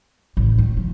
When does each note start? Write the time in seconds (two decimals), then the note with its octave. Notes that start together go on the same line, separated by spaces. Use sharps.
0.37 A1
0.58 D#3
0.77 F3